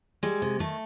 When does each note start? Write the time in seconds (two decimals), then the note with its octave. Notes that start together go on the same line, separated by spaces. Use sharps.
0.23 G3 G#3
0.42 C3
0.59 D#3 A3